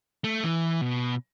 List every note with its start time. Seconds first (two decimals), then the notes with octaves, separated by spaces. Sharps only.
0.24 A3
0.44 E3
0.81 B2